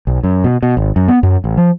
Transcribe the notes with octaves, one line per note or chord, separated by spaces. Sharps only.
B1
F#2
B2
B2
G#1
F#2
B3
F#2
A1
F3